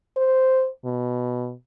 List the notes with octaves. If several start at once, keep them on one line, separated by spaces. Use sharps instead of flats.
C5
B2